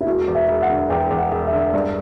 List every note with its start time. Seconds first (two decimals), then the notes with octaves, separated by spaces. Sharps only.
0.01 E4
0.07 E1 F#4
0.27 E2
0.35 E5
0.48 E1
0.62 F#5
0.70 D3
0.90 E2 G5
1.10 E2
1.18 F#5
1.32 E1
1.46 E5
1.53 D3
1.73 G2 D5